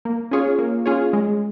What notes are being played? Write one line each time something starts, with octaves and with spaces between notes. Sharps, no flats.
A#3
C#4 F4 G#4 C#5
A#3
C#4 F4 G#4 C#5
G#3